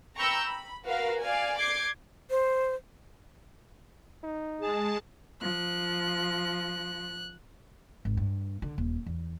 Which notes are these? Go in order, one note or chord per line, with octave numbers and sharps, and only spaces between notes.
G5 A#5 B5 C#6 E6 G6
B5
F#4 A#4 B4 F5
D5 F5 G#5
D6 G6 G#6 C7
C5
D#4
G#3 G#4 A5
F3 F#6
G#1
G2
D3
D#1
E2